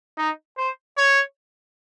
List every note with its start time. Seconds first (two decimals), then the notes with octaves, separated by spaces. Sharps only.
0.18 D#4
0.57 C5
0.97 C#5